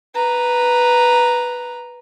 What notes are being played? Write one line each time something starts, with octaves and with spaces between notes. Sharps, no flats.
B4 A#5